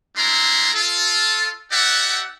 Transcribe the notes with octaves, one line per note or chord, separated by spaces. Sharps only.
G3 G#3 D4 E4 A#5 C6
F4 A4
D#4 G4 D5 E5 F#5